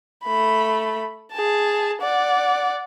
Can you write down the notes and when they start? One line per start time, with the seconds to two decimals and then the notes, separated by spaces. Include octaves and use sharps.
0.24 A3 B5
1.32 G#4 A5
2.02 D5 F#5